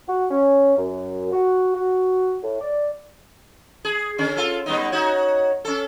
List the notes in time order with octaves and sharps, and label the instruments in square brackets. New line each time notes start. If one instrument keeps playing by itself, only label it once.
[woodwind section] F#4
C#4
F#2
F#4
F#4
A2
D5
[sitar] G#4
D3 C#4
F4 A4
G3 B3 D#4
D#4 F#4 C#5
C#4 A4